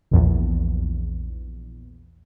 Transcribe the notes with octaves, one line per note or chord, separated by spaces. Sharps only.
A#1 E2